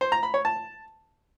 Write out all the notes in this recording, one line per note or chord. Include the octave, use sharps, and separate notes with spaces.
C5
A#5
B5
C#5
A5